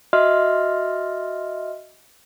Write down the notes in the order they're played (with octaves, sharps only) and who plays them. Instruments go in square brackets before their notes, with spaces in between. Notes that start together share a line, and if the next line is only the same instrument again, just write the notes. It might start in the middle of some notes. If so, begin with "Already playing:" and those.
[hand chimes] F#4 D#5 E5 C6 F6